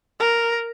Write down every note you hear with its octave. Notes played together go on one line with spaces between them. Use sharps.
A#4